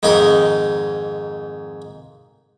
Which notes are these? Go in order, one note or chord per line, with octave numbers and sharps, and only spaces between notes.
F2 G#2 D#3 D#4 A#4 D#5